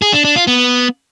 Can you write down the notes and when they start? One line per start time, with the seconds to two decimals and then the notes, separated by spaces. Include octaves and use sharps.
0.02 G#4
0.13 D4
0.24 D4
0.36 F4
0.47 B3